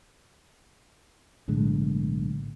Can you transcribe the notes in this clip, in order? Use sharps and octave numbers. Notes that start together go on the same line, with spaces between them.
B1 A2 D3 G#3